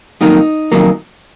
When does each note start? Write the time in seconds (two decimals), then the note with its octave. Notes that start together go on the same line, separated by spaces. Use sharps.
0.21 F2 D#3 F#3 A#3 D#4
0.72 F2 D#3 F#3 A#3